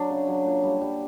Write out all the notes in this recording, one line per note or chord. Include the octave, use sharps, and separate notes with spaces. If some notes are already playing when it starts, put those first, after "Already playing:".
Already playing: F#3 D4
C#3
F#3
A#2
G3
G3